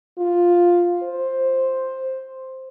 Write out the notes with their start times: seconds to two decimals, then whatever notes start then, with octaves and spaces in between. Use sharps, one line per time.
0.17 F4
1.03 C5